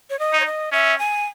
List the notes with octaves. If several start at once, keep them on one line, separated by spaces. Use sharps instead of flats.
C#5
D#5
D#4
C#5
D#5
C#4 E5
G#5